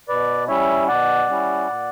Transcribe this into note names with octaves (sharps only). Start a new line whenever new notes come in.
B2 B4 D5
G3 C#4 E4 C#5 E5
B2 D5 F#5
G3 C#4 E4
A#2